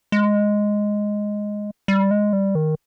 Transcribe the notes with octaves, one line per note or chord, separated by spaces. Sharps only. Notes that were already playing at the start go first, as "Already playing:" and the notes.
G#3
G3
G#3
G3
D#3